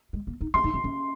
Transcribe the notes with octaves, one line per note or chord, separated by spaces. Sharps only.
G#3
A#3
D#4
C#4 C6
D#4
C#4
C#4